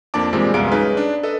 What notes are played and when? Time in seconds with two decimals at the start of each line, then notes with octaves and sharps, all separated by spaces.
0.14 F2 A#3 D4 D5 A5 D6
0.33 A#2 E3 G3 G#3 C4
0.54 C2 F#2 G#3 B3 F5 D7
0.72 C#4 D#4 G#4 B4
0.97 D4
1.23 A4 B4 D#5